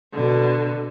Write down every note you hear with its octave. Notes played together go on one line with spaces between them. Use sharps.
B2 D3